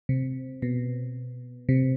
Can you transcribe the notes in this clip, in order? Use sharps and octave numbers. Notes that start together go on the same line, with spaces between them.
C3
B2
C3